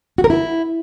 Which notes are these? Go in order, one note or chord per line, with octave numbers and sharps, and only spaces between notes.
F#4
A#4
E4